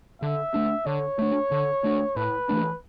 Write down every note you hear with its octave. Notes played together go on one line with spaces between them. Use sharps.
D3 E5
A3 D4
D3 C#5
A3 D4
D3
A3 D4
A2 B4
E3 A3 D4